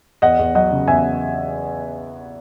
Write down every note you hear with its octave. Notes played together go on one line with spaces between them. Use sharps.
E2 D#5 F#5
E2
F#3 D#5 F#5
C#3
E2 E5 G#5